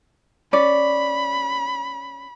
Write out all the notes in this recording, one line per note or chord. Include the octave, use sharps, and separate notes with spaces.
C#4 D5 B5